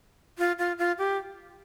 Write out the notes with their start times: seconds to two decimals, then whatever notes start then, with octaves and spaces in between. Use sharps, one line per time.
0.38 F4
0.59 F4
0.79 F4
0.98 G4